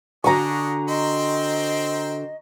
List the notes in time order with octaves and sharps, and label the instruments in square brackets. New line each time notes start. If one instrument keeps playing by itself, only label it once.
[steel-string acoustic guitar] D3 F#4 G#5 [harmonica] D4 D#5 [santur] A#5 C#6
[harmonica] C4 C5 G5 [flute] D#5